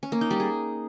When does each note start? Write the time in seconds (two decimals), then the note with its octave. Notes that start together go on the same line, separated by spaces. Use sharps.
0.03 C#4
0.12 A#3
0.21 D#4
0.31 G3
0.40 G#4